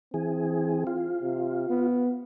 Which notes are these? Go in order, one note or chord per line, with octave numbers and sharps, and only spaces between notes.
E3 C4 G#4
F4
C3
B3